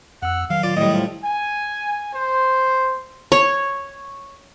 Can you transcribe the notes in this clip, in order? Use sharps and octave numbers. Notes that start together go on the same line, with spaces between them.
F2 F#5 E6
D#3 F#3 F5
F4 D5
A2 G3 D#5
F3
G#5
C5
C#5